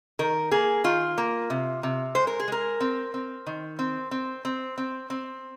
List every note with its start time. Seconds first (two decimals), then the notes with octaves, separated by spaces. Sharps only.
0.19 D#3 A#4
0.51 A#3 G#4
0.84 D#3 F4
1.18 A#3
1.50 C3
1.83 C3
2.15 G#3 C5
2.27 A#4
2.40 G#4
2.48 G#3 A#4
2.80 C4
3.14 C4
3.47 D#3
3.79 C4
4.11 C4
4.45 C4
4.78 C4
5.10 C4